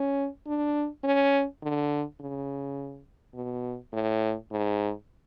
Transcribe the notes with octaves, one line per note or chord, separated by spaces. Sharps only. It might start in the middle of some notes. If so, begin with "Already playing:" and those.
Already playing: C#4
D4
C#4
D3
C#3
B2
A2
G#2